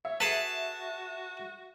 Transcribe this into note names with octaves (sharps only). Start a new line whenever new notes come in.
C#5 E5
F#4 G#4 A4 B4 A5